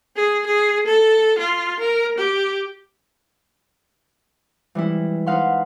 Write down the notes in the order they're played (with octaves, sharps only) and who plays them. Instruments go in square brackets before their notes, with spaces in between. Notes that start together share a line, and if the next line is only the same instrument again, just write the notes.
[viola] G#4
G#4
A4
F4
A#4
G4
[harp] E3 G3 G#3 E4
D#4 B4 F5 F#5 C6